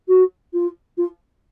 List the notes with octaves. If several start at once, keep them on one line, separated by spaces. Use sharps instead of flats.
F#4
F4
F4